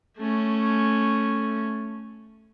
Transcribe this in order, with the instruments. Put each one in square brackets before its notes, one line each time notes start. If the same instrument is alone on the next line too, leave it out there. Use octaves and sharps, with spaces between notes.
[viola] A3 C#4